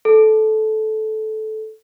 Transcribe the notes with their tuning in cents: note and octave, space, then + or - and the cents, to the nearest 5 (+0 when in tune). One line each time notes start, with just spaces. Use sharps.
A4 -15